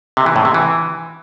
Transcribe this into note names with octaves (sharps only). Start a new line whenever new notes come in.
C3
E3
A2
C3
E3